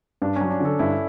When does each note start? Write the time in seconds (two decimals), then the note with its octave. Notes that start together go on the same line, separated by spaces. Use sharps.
0.22 G2 D4
0.36 C#4
0.41 F#3
0.51 D4
0.60 D3 A4
0.79 G2 E4